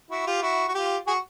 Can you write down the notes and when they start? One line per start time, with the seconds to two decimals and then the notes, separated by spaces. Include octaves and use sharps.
0.11 E4 F#4
0.27 F4 G4
0.42 E4 F#4
0.68 F#4
0.74 F4 G4
1.07 F#4 G#4